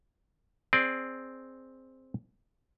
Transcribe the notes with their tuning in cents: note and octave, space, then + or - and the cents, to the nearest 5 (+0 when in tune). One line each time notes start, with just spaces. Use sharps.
C4 +0 G#4 +0 D5 +0